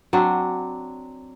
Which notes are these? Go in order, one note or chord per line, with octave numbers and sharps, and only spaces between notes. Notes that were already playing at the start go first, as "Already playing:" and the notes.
F#3 C4 D4